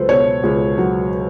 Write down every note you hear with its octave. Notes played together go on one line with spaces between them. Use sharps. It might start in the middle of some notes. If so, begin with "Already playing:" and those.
Already playing: C#2 F#3 A4 B4 C5
B2 C#5
C#2
F#3